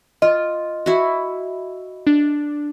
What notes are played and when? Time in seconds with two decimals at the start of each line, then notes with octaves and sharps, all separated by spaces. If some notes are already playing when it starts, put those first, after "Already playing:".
0.22 F4 D#5
0.86 E4 F#4
2.07 D4